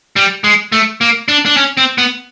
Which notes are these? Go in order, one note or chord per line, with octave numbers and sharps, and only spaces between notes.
G3
G#3
A3
A#3
D4
D4
C#4
C4
B3